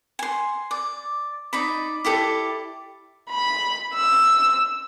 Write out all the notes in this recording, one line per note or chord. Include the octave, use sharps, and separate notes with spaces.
G#5 C6
D5
D#4 D5 B5
E4 G4 A4 D5
B5
E6